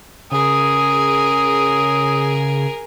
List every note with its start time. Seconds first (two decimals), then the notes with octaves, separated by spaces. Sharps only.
0.32 C#3 G#4 A#4 D#6